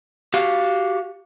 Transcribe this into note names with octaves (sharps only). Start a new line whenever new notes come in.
F#4 G4 F5